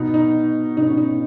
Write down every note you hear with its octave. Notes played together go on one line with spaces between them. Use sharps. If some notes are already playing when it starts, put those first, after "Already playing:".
Already playing: B2 B3 D#4
D#4
B2 B3 D#4
C#4
D#4